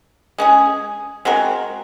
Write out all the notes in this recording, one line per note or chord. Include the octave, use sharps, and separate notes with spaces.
G#3 C#4 G#4
G#3 C4 F#4 A#4